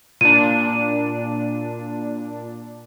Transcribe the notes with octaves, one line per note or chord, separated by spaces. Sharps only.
A#2 D4 D#7